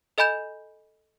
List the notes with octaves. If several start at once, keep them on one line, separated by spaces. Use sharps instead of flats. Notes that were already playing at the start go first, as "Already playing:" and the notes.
A4 D#5 G#5 B5 G6 E7